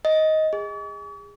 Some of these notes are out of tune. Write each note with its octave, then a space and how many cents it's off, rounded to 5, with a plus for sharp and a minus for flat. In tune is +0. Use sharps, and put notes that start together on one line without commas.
D#5 +15
G#4 -25